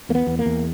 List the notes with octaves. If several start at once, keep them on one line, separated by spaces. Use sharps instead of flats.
E2 A#3
B3
E2
A#3
E2